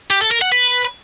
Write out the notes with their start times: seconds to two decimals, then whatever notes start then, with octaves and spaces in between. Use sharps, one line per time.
0.10 G4
0.21 A4
0.31 A#4
0.41 F#5
0.52 B4